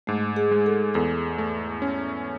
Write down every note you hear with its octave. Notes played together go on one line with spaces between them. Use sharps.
G#2 A3
G#4
G#3
A4
E2 A4
A3
C#4